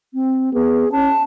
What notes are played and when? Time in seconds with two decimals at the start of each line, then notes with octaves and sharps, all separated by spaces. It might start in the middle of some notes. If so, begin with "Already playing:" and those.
0.14 C4
0.54 B3 G#4
0.92 C#4 A5